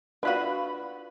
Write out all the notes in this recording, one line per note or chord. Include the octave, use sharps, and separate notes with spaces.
D4 F4 F#4 B4 B5